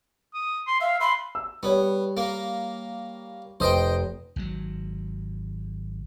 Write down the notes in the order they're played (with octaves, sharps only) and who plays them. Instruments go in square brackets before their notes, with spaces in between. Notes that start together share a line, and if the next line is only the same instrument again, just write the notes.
[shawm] D#6
C6
[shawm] E5 [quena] F5
[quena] B5 [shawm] C6
[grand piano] E6
[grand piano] G3 C#5 [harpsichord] B3
[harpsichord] A#3
[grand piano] F1 B4 D#6 [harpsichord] C5 D#5 G5
[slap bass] G#1 G#2 F#3